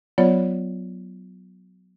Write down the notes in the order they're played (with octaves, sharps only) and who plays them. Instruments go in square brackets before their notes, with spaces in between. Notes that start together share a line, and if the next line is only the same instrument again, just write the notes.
[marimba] F#3 B3 F4 C#5 D5